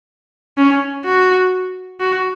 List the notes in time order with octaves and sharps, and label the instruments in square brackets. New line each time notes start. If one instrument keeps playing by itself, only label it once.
[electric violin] C#4
F#4
F#4